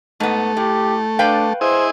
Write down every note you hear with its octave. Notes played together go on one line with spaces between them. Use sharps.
G#2 A3 B3
A2 G4
D4 B4 F5 G5
E4 G#4 C5 D#5